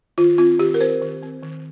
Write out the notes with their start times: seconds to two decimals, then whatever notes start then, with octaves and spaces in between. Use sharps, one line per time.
0.18 D#3 F4
0.38 C4 F4
0.59 D#3 G4
0.74 A#4
0.81 C4 C5
1.02 D#3
1.22 C4
1.43 D#3